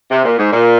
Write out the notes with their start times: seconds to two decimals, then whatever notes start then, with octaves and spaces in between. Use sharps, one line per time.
0.10 C3
0.23 A#2
0.37 G#2
0.51 A#2